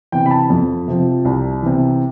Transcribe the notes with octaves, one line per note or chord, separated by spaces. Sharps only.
C3 E3 G5
B5
A5
F2
C3 F3
C2
C3 E3